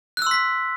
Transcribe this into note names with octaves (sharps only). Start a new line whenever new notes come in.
C6 E6 F#6 B6